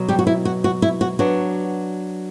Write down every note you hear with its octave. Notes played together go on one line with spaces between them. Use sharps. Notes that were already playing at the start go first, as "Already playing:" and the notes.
Already playing: B2 F#3
G3 G4
F#4
E4
F#4
F#4
E4
F#4
F#3 B3 D4 F#4